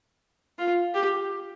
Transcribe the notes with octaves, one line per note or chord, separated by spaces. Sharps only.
F4
G4